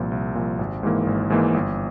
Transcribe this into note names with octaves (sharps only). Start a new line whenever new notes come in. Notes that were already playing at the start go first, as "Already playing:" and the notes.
Already playing: C2 A#2 F3
C2
A#2 F3
G#1
G#2 E3 A#3
G#1
G#2 E3 A#3
G1